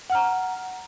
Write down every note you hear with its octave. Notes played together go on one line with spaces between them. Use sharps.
F#5 A#5 F6